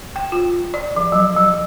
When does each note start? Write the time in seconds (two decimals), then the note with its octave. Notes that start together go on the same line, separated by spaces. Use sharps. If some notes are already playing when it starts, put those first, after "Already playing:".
0.16 G5
0.32 F4
0.74 D5
0.96 F3
1.12 F#3
1.36 F#3